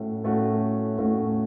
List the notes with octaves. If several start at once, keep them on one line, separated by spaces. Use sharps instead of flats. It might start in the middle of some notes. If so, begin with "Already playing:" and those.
Already playing: A2 A3 C#4 F#4
A2 A3 C#4 F#4
A2 A3 C#4 F#4